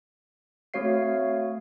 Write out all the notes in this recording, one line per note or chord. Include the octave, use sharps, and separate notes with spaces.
A3 C4 F#4 C#5 F5 C7